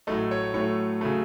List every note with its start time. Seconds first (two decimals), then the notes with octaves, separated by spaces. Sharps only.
0.07 A2 F#3 A3 D#5
0.31 C#5
0.54 A2 F#3 A3 C#5
1.01 C#3 F#3 A3